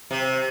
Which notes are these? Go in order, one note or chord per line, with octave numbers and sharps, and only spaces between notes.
C3